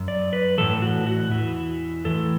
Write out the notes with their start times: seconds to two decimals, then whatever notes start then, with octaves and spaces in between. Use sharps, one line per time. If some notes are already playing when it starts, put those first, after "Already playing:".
Already playing: F#2
0.08 D5
0.33 B4
0.57 A2 E3 A4
0.82 F#4
1.07 F#4
1.31 E2 E3
2.04 A2 E3 A4